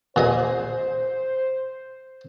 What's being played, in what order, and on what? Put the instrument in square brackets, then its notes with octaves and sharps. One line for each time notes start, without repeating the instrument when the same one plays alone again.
[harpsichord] A#2 G#4 D#5 [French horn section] C5